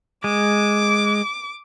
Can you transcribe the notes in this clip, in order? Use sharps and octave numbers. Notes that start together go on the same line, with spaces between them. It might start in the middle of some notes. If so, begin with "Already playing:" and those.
G#3 D6